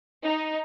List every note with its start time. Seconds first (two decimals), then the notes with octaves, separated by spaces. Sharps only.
0.24 D#4